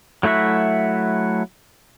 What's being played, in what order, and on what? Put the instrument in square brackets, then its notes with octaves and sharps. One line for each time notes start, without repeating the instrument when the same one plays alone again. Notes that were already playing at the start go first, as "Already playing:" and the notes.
[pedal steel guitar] F#3 A3 E4 F#4 E5